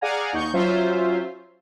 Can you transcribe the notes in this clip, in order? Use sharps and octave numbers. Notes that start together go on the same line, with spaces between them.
G#4 D5 F5 F#5 G#5 A#5
D#2 D#4 C#6 G6
F#3 C#4 F4 C5 E5